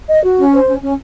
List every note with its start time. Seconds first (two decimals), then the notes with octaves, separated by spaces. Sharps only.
0.09 D#5
0.24 F#4
0.38 C#4
0.53 C5
0.67 C#4
0.82 C#4